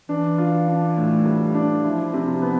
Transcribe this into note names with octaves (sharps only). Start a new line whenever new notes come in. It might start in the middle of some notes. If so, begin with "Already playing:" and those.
E3 D4
F4
D4
A2
G3
D4
F3 E4
C3
B3